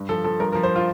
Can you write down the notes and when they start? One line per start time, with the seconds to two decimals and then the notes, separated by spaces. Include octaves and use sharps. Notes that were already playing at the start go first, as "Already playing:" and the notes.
Already playing: G2
0.09 F3 A4
0.24 F3 A4
0.40 G2 A#4
0.52 F3 A#4
0.63 C5
0.76 F4